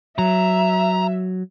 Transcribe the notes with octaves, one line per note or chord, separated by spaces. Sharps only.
F#3 E5 A#5